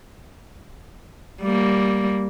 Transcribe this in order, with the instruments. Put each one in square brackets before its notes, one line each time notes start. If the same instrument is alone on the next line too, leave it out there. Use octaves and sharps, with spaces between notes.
[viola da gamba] G3 A#3